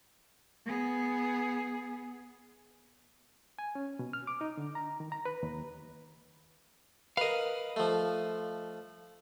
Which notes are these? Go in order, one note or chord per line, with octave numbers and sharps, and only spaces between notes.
B3 G#4
G#5
C#4
B2
F6
D6
D#4
D3
A#5
D#3
A#5
B4
D#2
A#4 B4 D#5 F5
F3 A3